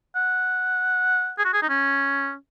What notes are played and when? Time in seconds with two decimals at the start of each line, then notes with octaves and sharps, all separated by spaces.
0.15 F#5
1.38 G#4
1.45 F#4
1.53 G#4
1.62 D#4
1.69 C#4